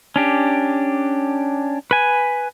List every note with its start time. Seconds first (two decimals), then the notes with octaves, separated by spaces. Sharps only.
0.16 C#4 D4 G4
1.91 B4 G#5